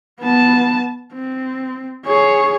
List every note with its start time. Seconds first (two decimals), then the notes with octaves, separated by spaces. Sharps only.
0.20 B3 A5
1.13 C4
2.06 G#4 C#5